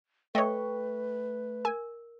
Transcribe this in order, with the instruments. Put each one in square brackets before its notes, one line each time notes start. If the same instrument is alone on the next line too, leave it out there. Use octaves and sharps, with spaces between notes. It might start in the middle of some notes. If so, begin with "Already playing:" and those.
[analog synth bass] A3 [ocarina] B4 [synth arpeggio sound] C#5 D#5 [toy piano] G5 C#6
[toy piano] A#4 [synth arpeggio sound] G#5